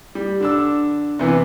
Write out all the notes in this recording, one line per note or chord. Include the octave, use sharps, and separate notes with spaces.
G3
D3 D4 E6
C3 E3 B3